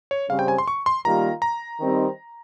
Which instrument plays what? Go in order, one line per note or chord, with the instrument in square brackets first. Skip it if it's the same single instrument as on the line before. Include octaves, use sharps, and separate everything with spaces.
[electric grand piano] C#5
[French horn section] C#3 G3 C4 [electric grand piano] F5
[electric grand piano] G5
G#5
C6
C#6
C6
[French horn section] D#3 G3 A#3 F4 [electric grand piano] A#5
[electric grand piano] A#5
[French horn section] D#3 G3 C4 D#4